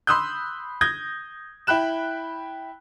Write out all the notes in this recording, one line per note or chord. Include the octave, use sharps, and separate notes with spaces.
B5 C6 D#6 E6 F#6 G6
D#6 G6 G#6 A#6
E4 G5 B5 F#6 E7